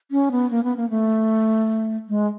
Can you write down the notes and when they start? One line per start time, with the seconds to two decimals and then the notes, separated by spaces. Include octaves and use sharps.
0.11 C#4
0.31 B3
0.51 A#3
0.64 B3
0.77 A#3
0.90 A3
2.09 G#3